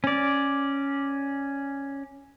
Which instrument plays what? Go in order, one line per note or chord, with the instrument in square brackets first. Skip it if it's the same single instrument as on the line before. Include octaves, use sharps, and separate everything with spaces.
[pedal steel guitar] C#4 D5